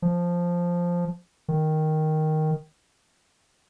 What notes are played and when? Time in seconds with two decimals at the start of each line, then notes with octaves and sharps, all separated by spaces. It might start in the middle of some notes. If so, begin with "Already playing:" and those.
0.02 F3
1.48 D#3